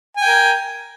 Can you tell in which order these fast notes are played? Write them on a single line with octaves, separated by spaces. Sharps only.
G#5 G5 A#4